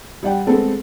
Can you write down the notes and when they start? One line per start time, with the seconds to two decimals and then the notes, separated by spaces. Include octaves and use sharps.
0.23 G3 D5 F#5 G5
0.47 G#3 A3 B3 C4 A4